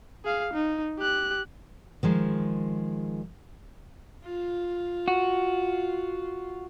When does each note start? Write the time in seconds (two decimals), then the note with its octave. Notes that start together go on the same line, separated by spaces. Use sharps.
0.25 G#4 F5
0.54 D#4
0.99 G4 F#6
2.03 D#3 F3 G#3
4.25 F4
5.08 F#4